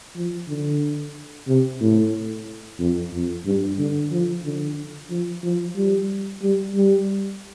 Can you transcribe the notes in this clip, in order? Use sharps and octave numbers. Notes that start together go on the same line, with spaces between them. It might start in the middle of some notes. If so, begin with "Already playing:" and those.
F3
D3
C3
A2
F2
F2
G2
D3
F3
D3
F3
F3
G3
G3
G3